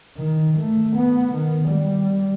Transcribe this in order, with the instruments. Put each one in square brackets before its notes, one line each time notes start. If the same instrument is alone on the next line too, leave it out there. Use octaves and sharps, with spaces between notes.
[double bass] D#3
A3
B3
D#3
G3